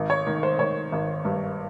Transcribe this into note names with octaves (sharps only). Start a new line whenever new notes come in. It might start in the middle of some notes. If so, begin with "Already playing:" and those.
Already playing: G#1
C#5
D#3
C5
D#3 C#5
G#1
G2